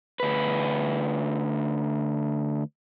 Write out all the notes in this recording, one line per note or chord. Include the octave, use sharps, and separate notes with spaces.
D2 B4